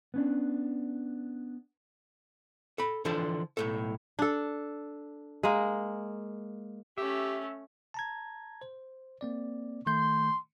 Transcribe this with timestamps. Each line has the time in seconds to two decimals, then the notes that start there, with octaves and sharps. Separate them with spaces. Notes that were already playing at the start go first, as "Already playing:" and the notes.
0.14 B3 C#4 D4
2.78 A4 B5
3.05 D3 E3 F3 D4 A4 C5
3.57 B1 A2 A4
4.19 D4 A4
5.43 G#3 A#3
6.98 A3 C#4 G4 E5
7.94 A5 A#5 G#6
8.62 C5
9.21 A#3 C4 D5
9.86 D#3 A3 C6 G6